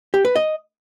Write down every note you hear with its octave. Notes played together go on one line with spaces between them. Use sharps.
G4
B4
D#5